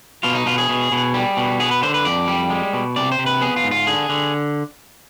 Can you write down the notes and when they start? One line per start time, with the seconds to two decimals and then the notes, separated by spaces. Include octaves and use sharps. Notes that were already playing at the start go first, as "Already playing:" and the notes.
0.23 B2 F4
0.35 D#4
0.46 B2 F4
0.58 G#4
0.69 B2
0.92 B2
1.14 G3
1.37 B2
1.60 B3 G#4
1.71 B4
1.82 D3 C5
1.94 B4
2.05 F2 D5
2.28 G3
2.50 G#3
2.73 B2
2.96 C3 D5
3.12 C5
3.19 C3
3.26 B4
3.41 B3 G#4
3.56 F4
3.64 G#2
3.71 F4
3.87 D3 G#4
4.09 D3